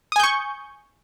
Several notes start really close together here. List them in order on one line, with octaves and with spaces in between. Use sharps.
D#6 G#5 G6 C#6